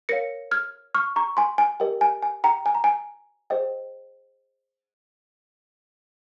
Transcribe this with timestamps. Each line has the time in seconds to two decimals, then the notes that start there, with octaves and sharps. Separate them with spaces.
0.09 A#4 C#5 F5 A#6 C#7
0.51 F6 G#6
0.94 C#6 F6
1.16 A#5 C#6
1.37 G#5 C6
1.58 G#5
1.80 G4 A#4 D#5 G5
2.01 G#5
2.22 G#5
2.44 G5 A#5
2.66 G#5
2.75 A#5
2.84 G#5
3.50 G#4 C5 D#5 G5